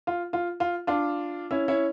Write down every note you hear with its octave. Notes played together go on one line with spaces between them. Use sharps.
F4
F4
F4
D4 F4
C#4 E4
C#4 E4